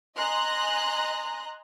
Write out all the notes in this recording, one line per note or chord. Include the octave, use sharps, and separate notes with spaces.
D#5 G#5 A#5 C6 F#6